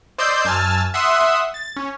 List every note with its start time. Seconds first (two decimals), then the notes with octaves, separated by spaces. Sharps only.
0.18 C5 D5 D#5 C6 E6 G6
0.45 F#2 G#5 A5 E6 F6
0.94 E5 F#5 C6 D#6
1.54 A6
1.77 C#4